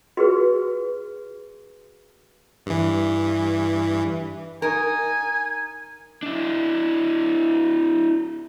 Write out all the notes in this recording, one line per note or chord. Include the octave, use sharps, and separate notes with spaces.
F#4 G#4 B4
G2 E3
D#4 A#4 G#5
D4 E4